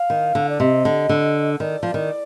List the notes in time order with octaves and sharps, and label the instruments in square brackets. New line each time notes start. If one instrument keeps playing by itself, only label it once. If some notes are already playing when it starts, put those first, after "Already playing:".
Already playing: [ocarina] F5
[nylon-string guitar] D#3
D3
[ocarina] D5
[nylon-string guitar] C3 [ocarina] D#5
[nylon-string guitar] D3
D3
[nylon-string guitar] D#3 [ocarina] D5
[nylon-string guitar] F3
D#3